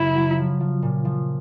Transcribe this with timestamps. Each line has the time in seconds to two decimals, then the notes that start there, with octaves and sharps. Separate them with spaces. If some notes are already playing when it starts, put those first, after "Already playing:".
Already playing: F#2 C#3 E4
0.16 F#3
0.38 F3
0.60 F3
0.82 A#2
1.05 F3